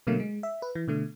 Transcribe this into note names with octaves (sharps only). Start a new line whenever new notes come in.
B2 D3 F#3 A3 A#3
G#3
E5
B4
E3
B2 D3 A3